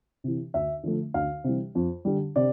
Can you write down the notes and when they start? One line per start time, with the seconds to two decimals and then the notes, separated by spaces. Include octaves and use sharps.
0.24 C3 E3
0.54 D2 E5
0.83 D3 F3 A3
1.14 D2 F5
1.44 C3 E3 G3
1.75 F2
2.05 D3 G3
2.36 C3 D5